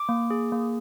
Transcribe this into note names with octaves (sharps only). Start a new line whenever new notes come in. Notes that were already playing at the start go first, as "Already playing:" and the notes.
Already playing: D6
A#3
G#4
A#3